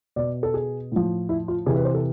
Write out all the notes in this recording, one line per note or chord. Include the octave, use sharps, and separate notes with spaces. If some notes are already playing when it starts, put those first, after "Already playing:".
B2 D5
A4
G#4
A2 F3
E4
F4
C3 E3 G#4
B4
C5
A4